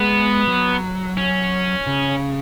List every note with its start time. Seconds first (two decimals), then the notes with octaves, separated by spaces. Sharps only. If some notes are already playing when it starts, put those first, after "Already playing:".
Already playing: G#3 B3
0.48 F#3
1.17 C#4
1.87 C#3